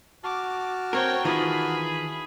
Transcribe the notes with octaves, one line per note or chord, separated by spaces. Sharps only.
F#4 A5 D6 F6
C4 A#4 C#5 G5
D#3 E3 F4 G#4 B5